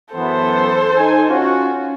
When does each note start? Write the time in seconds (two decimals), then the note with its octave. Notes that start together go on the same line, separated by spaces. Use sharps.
0.15 F#2 E3 B3 A4 C5
0.97 D#4 G#5
1.29 C#4 F4 F#4